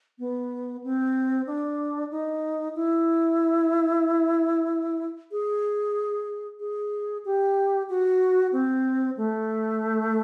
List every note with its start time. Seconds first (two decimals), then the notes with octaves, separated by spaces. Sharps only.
0.19 B3
0.84 C4
1.47 D4
2.11 D#4
2.75 E4
5.32 G#4
6.60 G#4
7.25 G4
7.89 F#4
8.52 C4
9.17 A3